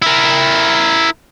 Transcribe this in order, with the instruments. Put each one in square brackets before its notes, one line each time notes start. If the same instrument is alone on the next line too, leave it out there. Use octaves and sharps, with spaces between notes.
[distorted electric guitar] E4 A#4